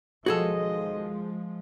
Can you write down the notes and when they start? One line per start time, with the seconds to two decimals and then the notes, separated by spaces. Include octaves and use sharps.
0.26 B1 D#3 F3 G#3 F#4 G#4 A4 D#5